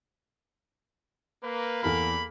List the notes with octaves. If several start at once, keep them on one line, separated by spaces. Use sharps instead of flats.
A#3 B4
E2 A4 B5 F6